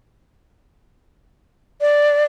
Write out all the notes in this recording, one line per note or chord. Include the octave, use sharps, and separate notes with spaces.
D5